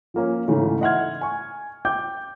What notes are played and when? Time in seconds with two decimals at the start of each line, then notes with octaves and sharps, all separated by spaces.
0.14 F3 A#3 C#4
0.48 G#2 C#3 E3 G#3 A3
0.81 D#5 E5 F#5 C6 F6 G#6
1.21 G#5 C#6
1.85 G5 D6 G6